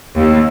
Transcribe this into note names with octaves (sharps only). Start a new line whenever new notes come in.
D#2